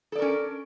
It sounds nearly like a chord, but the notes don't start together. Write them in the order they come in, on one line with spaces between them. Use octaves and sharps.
A4 D5 A#4 C#4